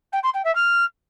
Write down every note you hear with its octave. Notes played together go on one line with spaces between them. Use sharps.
G5
C6
G5
E5
F6